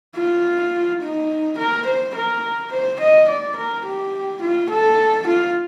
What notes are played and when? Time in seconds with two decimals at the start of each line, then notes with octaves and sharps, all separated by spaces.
0.16 F4
1.01 D#4
1.58 A#4
1.85 C5
2.15 A#4
2.72 C5
3.00 D#5
3.28 D5
3.56 A#4
3.85 G4
4.42 F4
4.70 A4
5.26 F4